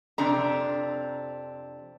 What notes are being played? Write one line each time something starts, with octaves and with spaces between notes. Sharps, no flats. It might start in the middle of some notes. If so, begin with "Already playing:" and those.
F2 C3 D4 A#5